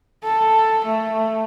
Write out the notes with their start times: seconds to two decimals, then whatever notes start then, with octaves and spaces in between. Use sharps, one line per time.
0.23 A4
0.85 A3